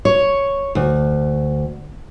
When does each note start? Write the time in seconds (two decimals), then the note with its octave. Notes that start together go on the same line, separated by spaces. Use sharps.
0.05 C#5
0.75 D2